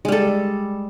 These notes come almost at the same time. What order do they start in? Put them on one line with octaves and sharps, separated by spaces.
G#3 G3 A4